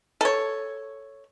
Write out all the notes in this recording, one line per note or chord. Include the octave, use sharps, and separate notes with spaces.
A4 C#5